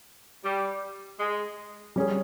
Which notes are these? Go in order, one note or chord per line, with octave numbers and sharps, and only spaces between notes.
G3
G#3
G3 C#4 G#4